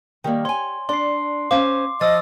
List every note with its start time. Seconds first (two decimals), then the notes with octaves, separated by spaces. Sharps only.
0.24 D#3 G3 A#3 G4
0.45 C#5 G#5 C6
0.89 D4 D5 C6 C7
1.51 C#4 C5 F5 D6
2.01 F3 D#5 D#6 E6 A6